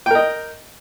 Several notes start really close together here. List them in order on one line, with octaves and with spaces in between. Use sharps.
G5 A#4 D#5